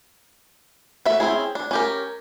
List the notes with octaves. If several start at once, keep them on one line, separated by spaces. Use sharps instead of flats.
A3 F#4 E5
C4 C#4 E4 G#4
D4
C#4 G4 A#4